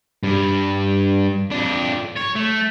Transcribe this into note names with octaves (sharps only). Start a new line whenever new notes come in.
G2
F2 D4
C#5
A3